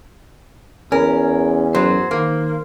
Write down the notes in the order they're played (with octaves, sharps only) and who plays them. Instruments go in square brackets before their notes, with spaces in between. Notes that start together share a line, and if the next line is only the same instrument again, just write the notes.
[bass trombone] E2 [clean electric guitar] C#4 [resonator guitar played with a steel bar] A#4
[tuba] F#2 [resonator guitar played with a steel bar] F#3 [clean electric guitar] C5
[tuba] D#3 [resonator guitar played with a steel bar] A#3